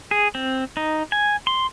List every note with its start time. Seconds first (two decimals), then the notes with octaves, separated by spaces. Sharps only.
0.11 G#4
0.35 C4
0.77 D#4
1.12 G#5
1.47 C6